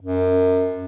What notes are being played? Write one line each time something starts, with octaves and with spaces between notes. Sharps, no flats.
F#2